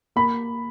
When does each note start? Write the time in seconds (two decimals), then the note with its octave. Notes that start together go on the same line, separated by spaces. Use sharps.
0.16 A#3 B5